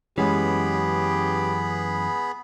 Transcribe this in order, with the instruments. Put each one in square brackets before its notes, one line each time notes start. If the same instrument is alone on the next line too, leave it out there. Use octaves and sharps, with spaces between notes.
[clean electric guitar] F#2 E3 [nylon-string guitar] G#3 C#4 [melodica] B3 G#4 B5 [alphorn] G4